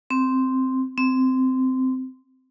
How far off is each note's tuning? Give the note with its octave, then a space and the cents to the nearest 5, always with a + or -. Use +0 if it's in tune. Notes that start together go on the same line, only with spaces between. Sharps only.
C4 -5
C4 -15